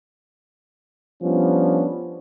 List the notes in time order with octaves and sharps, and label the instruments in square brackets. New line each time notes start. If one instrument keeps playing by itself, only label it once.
[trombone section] F3 G3 B3 C#4 D4